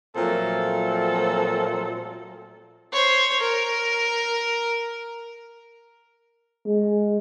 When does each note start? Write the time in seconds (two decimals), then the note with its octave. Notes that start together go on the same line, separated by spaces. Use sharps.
0.16 A#2 F3 F#3 A3 C4 A4
2.92 C5 C#5
3.40 A#4
6.66 G#3